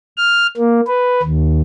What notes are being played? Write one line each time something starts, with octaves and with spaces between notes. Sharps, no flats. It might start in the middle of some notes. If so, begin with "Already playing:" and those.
F6
A#3
B4
D#2